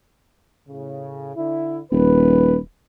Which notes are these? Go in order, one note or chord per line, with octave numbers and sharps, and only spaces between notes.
A2 C#3
D3 E4
D#1 B4